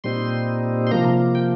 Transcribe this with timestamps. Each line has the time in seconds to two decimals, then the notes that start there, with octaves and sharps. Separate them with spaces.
0.04 A#2 G3 C4 D#4 C6
0.87 C6
0.91 C3 F3 A#3 A#5
1.35 G5